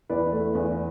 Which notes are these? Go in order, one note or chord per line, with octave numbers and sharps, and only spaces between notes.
E2 B4 D5
A3
E2